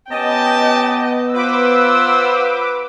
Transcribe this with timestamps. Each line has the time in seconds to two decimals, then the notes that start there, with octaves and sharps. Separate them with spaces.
0.10 B3 C#4 G4 D#5 G5 A5
1.34 F4 B4 C5 F#5 D6 E6